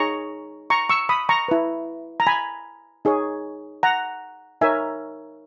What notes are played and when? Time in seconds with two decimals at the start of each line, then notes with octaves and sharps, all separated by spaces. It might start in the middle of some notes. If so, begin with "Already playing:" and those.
Already playing: D#4 G#4 C#5 A#5 C#6
0.70 A#5 C#6
0.89 C#6 E6
1.09 B5 D#6
1.29 A#5 C#6
1.48 E4 B4
2.20 A#5
2.27 G#5 B5
3.05 D#4 G#4 C#5
3.83 F#5 A#5
4.61 D#4 A#4 C#5 E5 G#5